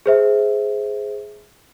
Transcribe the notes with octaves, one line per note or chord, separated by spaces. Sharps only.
G#4 C5 E5